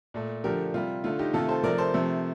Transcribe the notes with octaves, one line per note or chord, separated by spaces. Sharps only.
A#2 A3
D3 F3 A3 G4 A#4
C3 G3 F4
D3 A3 F4
D#4 G4
C3 D#3 A3 F4 A4
A4 C5
C3 F3 A3 A#4 D5
A4 C5
C3 F3 A3